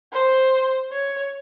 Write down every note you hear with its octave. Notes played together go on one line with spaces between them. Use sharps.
C5
C#5